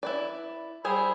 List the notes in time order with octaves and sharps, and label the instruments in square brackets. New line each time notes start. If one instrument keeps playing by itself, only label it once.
[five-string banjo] E4 B4 D5
[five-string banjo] G3 G#4 C5 [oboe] E4